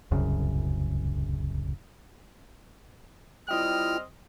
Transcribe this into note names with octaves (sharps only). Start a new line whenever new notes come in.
D1 C2 F#2 C#3
G3 C4 E4 F4 D#5 G5 F6